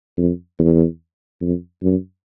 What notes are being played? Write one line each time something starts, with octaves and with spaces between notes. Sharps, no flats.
F2
E2
F2
F#2